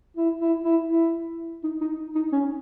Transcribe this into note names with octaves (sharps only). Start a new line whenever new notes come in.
E4
E4
E4
E4
D#4
D#4
D#4
C#4